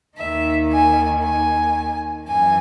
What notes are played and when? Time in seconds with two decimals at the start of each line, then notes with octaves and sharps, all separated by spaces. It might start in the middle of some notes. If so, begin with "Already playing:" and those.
0.17 D#2 D#3 E5
0.70 G#5
1.22 G#5
2.27 F#2 E3 G#5